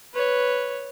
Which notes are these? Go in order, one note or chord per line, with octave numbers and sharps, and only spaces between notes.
B4 C#5